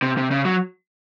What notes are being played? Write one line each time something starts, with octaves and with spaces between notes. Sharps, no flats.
C3
C3
C#3
F#3